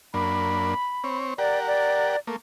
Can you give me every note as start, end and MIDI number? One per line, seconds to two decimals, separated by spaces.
0.14 0.74 42
0.14 0.74 58
0.14 0.74 62
0.14 1.18 83
1.04 1.34 60
1.04 1.34 73
1.38 2.16 67
1.38 2.16 70
1.38 1.59 74
1.38 2.16 78
1.67 2.18 74
2.27 2.36 57
2.27 2.36 58